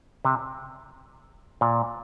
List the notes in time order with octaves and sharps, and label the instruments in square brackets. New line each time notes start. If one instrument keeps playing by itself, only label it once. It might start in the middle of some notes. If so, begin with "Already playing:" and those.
[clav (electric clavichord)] C3
A#2